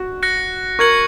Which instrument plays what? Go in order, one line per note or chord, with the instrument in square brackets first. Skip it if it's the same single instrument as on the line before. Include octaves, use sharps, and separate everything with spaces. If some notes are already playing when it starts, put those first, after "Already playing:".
Already playing: [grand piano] F#4
[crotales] F#6 A#6 C#7
[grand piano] A#4 [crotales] C#6 G#6 C#7 F#7